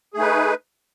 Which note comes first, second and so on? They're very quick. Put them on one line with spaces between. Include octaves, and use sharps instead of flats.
G#4 A3 D#4 B4